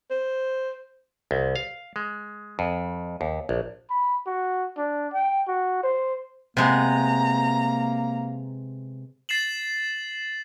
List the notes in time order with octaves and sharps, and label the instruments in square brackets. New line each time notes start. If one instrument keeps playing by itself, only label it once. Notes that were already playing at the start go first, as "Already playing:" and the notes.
[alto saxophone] C5
[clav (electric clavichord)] C2
F5
G#3
F2
D#2
A#1
[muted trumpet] B5
F#4
D4
G5
F#4
C5
[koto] C3 G#3 B3 [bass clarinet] A#3 [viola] A#5
[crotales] A6 C7 E7 F#7